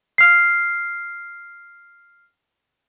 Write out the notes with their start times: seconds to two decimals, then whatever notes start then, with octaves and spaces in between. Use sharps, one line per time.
0.18 F6 C7